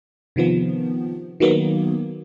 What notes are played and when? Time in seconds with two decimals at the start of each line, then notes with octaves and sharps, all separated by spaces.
0.36 C3 D#3 F3 B3
1.40 D#3 F#3 A#3 B3